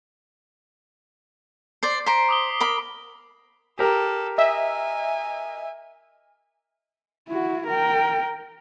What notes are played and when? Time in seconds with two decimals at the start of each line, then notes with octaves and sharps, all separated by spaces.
1.83 C5 D5 C7
2.06 C5 A#5 B6 D7
2.29 D6 D#6 G7
2.60 A#4 B5
3.79 G4 A4 A#4
4.38 D#5 E5 G#5
7.29 E4 F#4
7.67 A#4 G5